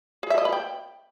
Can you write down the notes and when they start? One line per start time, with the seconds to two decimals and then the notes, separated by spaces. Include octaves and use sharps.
0.23 G#4
0.30 E5
0.38 D#5
0.45 B4
0.53 G5